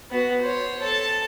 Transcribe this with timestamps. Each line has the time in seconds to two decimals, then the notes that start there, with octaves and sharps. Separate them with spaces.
0.11 B3 F#4
0.42 C5 C#5
0.82 A4 A5